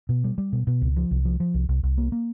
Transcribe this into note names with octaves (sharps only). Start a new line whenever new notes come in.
B2
G3
G3
B2
B2
C#2
F3
C2
F3
F3
C2
C2
C2
A#3
A#3